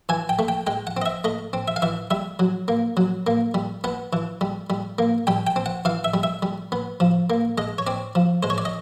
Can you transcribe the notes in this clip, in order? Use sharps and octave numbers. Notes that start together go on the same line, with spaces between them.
E3 G#5
G5
A3
G5
G#3 G5
F#5
C4 D#5
E5
A3 D#5
C4
E5
F5
E3 E5
G3 E5
F#3
A#3
F#3
A#3
G3
B3 F#5
E3
G3
G3
A#3
G3 G5
G5
C4
F#5
E3 F5
E5
G3
E5
G3
B3
F3
A#3
G#3 D#5
C#5
C4 D5
F3
G#3 C5
C#5
D5
D#5